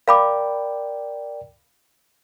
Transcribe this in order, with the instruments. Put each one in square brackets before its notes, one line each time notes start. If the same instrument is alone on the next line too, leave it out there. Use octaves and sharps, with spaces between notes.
[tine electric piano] A#4 D5 G5 [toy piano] F5 B5 D6